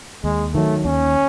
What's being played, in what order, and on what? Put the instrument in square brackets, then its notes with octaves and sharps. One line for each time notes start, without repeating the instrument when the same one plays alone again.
[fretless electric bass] D#2 [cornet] G#3
[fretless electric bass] D#3 F#3 [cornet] A3
[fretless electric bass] D#2 [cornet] C#4